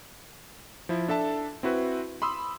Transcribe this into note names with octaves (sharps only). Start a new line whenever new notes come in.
F3 E4
D4 A4 E5 A5
C4 E4 F#4 B4
B5 C6 D#6 E6